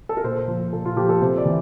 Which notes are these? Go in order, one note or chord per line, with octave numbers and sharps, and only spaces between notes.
A4
A#4
A#2 C5
F3
A#2 A4
F4
F3 G4
A4
C3 C5
D5
E3